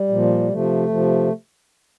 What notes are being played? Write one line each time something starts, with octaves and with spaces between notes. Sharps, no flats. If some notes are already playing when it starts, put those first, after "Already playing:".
Already playing: G3
A#2 F3
C3 F3 A3
C3 F3